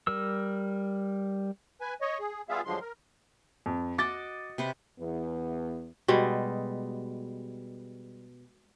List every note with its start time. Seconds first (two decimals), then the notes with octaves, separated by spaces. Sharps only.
0.07 G3 A#4 E6
1.81 B4 G#5
2.01 C#5 D#5
2.19 G#4
2.49 G3 B3 F4 G#4 E5 F5
2.65 G2 D3 F3 F#3 G#3 C6
2.81 A#4
3.66 F2
3.98 F#4 D#5 D6 A6
4.58 C3 B4 C5
5.00 E2 B3
6.08 B2 G3 G#3